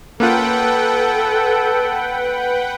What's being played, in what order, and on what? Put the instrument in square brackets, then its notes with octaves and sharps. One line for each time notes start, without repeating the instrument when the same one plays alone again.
[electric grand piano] A#3 C#4 F4 [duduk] A4 [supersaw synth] B4 F#5 G5